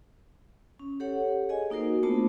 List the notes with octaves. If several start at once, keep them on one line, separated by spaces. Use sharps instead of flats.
C#4
G4 A4 C#5 F#5
G#4 D#5 G#5
A#3 D#4 F#4 A#4 C5
A3 B3 D4 F4 C5 A5